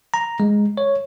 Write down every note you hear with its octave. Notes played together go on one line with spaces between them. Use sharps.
A#5
G#3
C#5